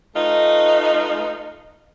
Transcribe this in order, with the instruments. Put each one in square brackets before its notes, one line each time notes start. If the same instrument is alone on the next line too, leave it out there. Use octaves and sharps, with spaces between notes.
[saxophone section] A3 D#4 F4 B4 D#5